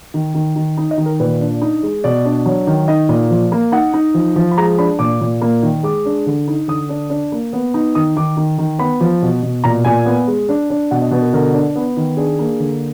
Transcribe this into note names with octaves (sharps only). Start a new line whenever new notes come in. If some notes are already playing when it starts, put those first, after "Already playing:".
D#3
D#3
D#3
D#4
D#5
D#3
A#4
A#2 B4
D4
D#4
G#3
B2 D5
D4
F#3
D#3
D#4 D#5
A#2
F3
A#3
D#4 F#5
D#4
F3
F3
B5
G#3 A#5
D4 B5
A#2 D6
A#2
A#3
D#3
G#3 D6
D4
D3
D#4
D3 D#6
D4
D4
A#3
B3
D#4
D#3 D#6
D#3 D6
D#3
D#3
B3 B5
F3
B2
B2
A#2 A#5
A#2 G#5
B3
G#3
D4
D4
B2 F#5
D#5
B2 B4
A#4
D3 A#4
D4
B3
D#3
D4 G#4
A#3
D3